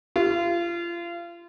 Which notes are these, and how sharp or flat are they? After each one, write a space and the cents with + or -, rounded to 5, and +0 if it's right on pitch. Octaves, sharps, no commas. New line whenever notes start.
F4 -30